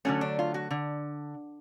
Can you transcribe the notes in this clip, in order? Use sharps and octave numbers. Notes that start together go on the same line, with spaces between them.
D3 F#3 A3 C#4
D4
F4
F#4
D3